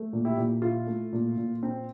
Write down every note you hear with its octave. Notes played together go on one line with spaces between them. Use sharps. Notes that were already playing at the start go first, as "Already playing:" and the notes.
Already playing: A3
A#2
E4 G4
A#2
E4 F4
A3
A#2
A#2
C4